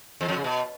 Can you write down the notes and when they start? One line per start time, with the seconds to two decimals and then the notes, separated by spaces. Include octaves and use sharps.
0.21 E2
0.28 F2
0.36 C#3
0.44 B2